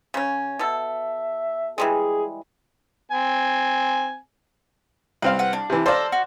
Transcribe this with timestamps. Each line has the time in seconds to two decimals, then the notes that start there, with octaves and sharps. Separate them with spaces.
0.14 C#3 C#4
0.59 B2 A4 E5
1.78 E3 G3 G#3 G#4
3.12 C4 G#5
5.22 C2 C4 B4 F5
5.39 B4 F#5
5.53 D4
5.70 C3 E3
5.86 A4 C5 D5 F5 A#5
6.12 F#4